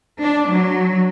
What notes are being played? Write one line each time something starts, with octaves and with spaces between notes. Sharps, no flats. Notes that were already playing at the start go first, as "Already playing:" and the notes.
D4
F#3